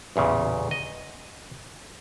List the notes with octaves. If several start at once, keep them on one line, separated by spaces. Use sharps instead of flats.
A1 E2 A#2 C#3
D#5